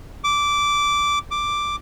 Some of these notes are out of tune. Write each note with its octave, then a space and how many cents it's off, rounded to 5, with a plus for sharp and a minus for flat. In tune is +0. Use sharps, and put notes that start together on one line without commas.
D6 -10
D6 +5